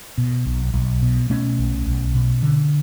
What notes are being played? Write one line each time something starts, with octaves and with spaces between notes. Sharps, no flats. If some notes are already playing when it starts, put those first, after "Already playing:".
B2
B1
B1
B2
B2 A3 C#4
B1
B1
B2
D3